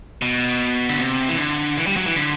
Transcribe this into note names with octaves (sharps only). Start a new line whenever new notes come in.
B2
D3
C3
E3
D3
E3
G3
F#3
E3
D3